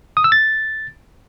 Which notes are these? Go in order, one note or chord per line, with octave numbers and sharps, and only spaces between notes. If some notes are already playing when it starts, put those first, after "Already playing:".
D#6
E6
A6